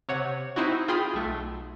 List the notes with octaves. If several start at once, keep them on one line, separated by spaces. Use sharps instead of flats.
C3 C#5 F#5
C4 D#4 E4 F#4
F4 G#4 G5 B5 C6 D#6
B1 A3